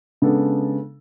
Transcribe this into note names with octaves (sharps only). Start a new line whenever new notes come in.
C#3 G#3 B3 D4 A4